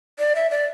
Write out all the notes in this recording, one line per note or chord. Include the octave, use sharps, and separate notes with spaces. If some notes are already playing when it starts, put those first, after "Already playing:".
D5
E5
D5